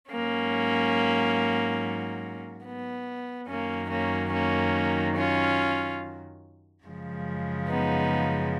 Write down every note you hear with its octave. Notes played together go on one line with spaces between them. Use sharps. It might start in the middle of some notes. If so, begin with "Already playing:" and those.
G#2 F#3 A#3 C#4
B3
F#2 D#3 F#3 A#3 C#4
A#3 C#4
A#3 C#4
C#4 F4
F#2 C#3 F3 G#3
B3 D#4